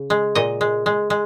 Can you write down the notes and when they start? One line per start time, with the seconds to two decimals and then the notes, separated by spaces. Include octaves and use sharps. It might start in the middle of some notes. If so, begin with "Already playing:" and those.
Already playing: C#3
0.10 G#3
0.35 A#2 D#5
0.61 G#3
0.86 G#3
1.10 G#3